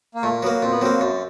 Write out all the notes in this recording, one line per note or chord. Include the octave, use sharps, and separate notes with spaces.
A#3
A#2 A3
F#3 A#3 B3
A#2 C4
B3
F#3 A#3 C4
F#2